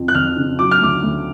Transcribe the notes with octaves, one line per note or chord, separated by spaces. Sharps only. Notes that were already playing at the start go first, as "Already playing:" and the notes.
Already playing: F2 F3
F#6
F2 F6
C#3
F#3 D6
F6
D2 D6
D2